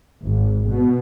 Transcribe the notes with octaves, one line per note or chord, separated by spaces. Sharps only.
G#1
B2